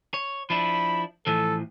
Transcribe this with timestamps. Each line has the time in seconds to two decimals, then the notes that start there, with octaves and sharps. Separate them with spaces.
0.14 C#5
0.50 F3 D4 E4 B5
1.27 A2 E3 F3 A4